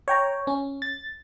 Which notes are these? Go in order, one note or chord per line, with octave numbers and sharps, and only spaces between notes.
C#5 G5 A#5
C#4
A6